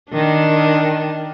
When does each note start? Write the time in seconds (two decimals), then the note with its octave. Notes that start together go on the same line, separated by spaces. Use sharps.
0.11 D#3 D4